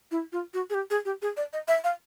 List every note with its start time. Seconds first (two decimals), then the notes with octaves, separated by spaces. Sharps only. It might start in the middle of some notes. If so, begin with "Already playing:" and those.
0.11 E4
0.32 F4
0.54 F#4
0.70 G#4
0.74 G4
0.90 G#4
1.05 G4
1.22 G#4
1.37 D5
1.53 D#5
1.68 E5
1.84 F5